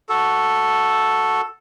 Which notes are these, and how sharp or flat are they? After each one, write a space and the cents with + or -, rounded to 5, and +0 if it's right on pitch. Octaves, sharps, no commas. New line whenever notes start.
F#4 +0 A4 +0